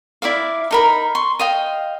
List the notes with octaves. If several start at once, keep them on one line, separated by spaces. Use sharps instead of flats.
E4 D5 E5 F5
D#4 A#4 B5
C6 C#6
D#5 F5 G5